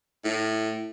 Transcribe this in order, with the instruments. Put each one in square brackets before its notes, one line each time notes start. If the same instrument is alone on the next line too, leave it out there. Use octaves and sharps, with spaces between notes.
[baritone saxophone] A2